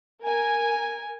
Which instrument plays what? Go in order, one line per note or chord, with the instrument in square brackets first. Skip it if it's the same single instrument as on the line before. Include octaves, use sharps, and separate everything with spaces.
[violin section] A#4 G#5